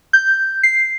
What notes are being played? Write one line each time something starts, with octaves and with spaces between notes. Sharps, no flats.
G6
C7